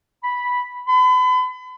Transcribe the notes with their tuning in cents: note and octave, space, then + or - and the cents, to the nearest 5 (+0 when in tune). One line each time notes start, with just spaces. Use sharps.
B5 -5
B5 +40